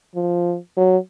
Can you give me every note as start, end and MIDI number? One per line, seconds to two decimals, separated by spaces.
0.15 0.57 53
0.77 0.97 54